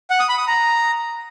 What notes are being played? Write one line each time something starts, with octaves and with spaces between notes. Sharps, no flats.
F#5
D#6
B5
D#6
A#5